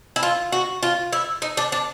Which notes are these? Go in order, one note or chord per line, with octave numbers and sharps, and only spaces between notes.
E4
F4
F#4
F4
E4
D#4
D4
D4